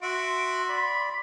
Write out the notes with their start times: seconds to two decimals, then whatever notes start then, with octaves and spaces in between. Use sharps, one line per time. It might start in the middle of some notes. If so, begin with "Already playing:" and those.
0.02 F#4 E5 C6 D7
0.69 D5 B5 B6